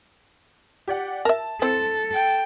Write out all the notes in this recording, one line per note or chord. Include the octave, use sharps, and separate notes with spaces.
G4 D5 F#5
A#4 E5 A5
C4 E4 A4 C5
G5